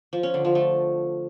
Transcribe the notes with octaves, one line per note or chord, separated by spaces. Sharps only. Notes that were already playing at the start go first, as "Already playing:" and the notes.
F3
C#4
D3
F3
A3